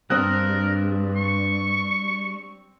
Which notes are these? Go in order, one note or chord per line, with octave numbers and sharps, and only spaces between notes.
G2 G3 C4 D4 A#4 D#6 F#6
C#6